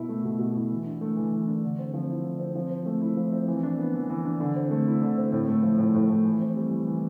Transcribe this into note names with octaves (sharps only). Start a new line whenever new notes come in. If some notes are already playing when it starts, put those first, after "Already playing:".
Already playing: B2 E4
A3
B2
B2
E4
E3
D4
A3
E3
E3
D4
D3
C4
F3
E4
D3
C4
F3
C4
A3
E4
F3
C4
E3
D4
B3
E3
E3
D4
D3
C4
A3
E4
D3
C4
A2
A3
F3
A2
A2
A3
E3
C4
G3
E3
E3